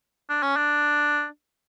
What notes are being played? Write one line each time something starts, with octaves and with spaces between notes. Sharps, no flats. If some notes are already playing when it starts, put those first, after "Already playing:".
D4
C#4
D4